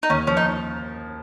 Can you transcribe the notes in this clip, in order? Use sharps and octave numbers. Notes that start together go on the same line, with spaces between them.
D#4
D#2 C#4
F3 C#4
D#4